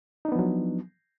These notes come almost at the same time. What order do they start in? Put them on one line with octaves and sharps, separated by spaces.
D#4 D4 B3 F3 F#3